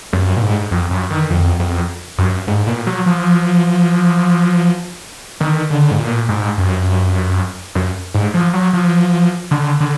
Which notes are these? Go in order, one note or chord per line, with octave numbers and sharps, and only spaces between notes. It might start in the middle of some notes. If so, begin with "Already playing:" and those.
F#2
A#2
G#2
F2
F#2
D#3
F2
F2
F#2
G#2
A#2
F#3
F3
D#3
D3
G#2
A#2
G#2
F#2
F#2
G#2
F3
F#3
F3
D3
D3